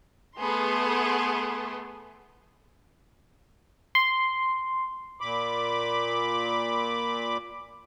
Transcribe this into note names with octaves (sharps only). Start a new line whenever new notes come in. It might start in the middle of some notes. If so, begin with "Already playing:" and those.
A3 B3 G#4 C6
C6
A#2 B5 D6